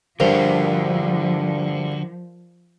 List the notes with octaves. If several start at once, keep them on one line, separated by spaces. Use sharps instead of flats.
G2 D3 F3 F#4 A#4 C5